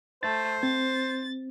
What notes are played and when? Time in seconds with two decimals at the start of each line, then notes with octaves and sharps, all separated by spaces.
0.23 A3 C5 A6
0.63 C4 A6